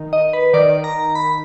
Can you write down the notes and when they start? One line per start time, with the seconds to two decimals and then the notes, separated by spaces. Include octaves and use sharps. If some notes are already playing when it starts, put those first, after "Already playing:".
Already playing: D#3 D#4
0.13 D#5
0.33 B4
0.53 D#3 D#4 D5
0.84 A#5
1.15 B5